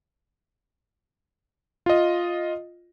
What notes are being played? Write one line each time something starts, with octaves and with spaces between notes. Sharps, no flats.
F4 D#5